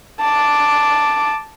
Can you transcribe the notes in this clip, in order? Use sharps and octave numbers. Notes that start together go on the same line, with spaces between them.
A5 D6